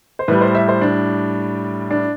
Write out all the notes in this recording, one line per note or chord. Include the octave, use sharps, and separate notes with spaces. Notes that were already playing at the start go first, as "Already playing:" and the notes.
C5
A2 G3 B4
C5
E5
C5
D4
D4